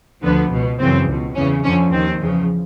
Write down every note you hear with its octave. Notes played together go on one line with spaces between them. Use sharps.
D2 D3 F3 B3
C#2 B2
F#2 C#3 E3 C4
C#2 B2
E2 C#3 E3 C#4
F2 D3 F3 C#4
D#2 D#3 C4
E2 C#3 F3